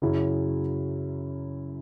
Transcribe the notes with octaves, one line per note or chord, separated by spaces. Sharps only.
F#2 C#3 F#3 C#4 E4